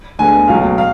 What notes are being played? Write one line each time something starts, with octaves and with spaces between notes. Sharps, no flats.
D2 D3 G#3 B3 G#5
C#2 B2 F#3 A3 F5
F5